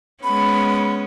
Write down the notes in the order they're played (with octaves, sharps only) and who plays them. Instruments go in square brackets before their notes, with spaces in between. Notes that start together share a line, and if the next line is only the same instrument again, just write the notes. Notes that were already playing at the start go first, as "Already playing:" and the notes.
[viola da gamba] G#3 B3 C#4 [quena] B5